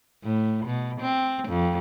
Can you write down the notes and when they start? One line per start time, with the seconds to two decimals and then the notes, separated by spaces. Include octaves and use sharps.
0.24 A2
0.65 B2
1.01 C4
1.49 F2